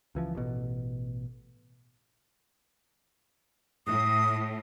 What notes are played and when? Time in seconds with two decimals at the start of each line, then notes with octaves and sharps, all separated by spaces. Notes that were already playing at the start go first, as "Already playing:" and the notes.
0.15 C#2 E3 F3
0.35 A1 B2
3.87 A2 D#6